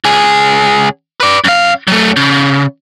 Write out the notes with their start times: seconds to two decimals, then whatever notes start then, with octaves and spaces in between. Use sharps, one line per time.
0.04 C#2 G#4
1.20 B4 D5
1.44 F#2 F5
1.88 F#3 A3
2.16 C#3